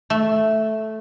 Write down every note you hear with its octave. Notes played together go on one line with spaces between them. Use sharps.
A3